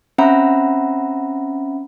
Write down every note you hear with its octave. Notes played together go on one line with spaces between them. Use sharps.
C4 C#4 E5 F#5 A#5 B5